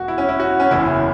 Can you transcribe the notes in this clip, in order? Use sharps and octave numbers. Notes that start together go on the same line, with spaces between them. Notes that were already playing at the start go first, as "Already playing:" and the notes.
Already playing: E1 F#4
E4
C#4
E4
F#4
C#4
F#1 E2 E3 E4